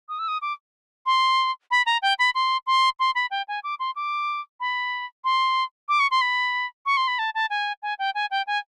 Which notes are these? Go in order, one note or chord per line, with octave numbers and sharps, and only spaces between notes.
D#6
E6
D#6
D6
C6
B5
A#5
G5
B5
C6
C6
C6
B5
G5
G#5
D6
C6
D6
B5
C6
D6
C#6
C6
B5
C#6
C6
B5
A5
A5
G#5
G#5
G5
G#5
G5
G#5